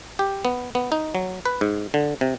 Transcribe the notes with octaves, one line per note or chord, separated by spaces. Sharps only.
G4
B3
B3
D#4
F#3
B4
G#2
D3
C3